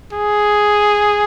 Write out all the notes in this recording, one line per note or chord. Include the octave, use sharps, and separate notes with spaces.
G#4